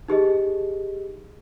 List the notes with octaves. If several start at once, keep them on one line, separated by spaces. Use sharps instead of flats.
D#4 G4 G#4 D#5